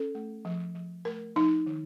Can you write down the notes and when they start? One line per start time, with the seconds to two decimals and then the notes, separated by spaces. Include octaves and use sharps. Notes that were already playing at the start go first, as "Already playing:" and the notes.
Already playing: C#4 A4
0.15 A3
0.45 F3
0.75 F3
1.05 A3 A#4
1.36 F3 D#4
1.66 D#3